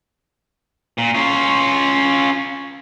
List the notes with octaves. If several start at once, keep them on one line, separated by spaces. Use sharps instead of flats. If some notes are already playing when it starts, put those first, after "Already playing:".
A#2
C#4 F4